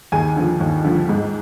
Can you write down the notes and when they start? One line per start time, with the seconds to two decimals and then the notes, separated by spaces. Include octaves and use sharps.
0.12 D#2 G#4 G#5
0.36 D3 F3
0.61 D#2
0.84 D3 F3
1.09 G#2